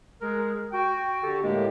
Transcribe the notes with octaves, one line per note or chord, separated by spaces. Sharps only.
G#3 A#4
F#4 G5
D3 G4 A4
A2 G#3 A#3 G4